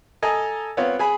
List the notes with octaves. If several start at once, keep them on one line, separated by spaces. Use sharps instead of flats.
A4 D#5 G#5 A#5
B3 C4 F4 C#5
G#4 G#5 B5